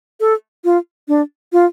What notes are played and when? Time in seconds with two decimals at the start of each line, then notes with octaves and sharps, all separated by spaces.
0.20 A4
0.64 F4
1.08 D4
1.53 F4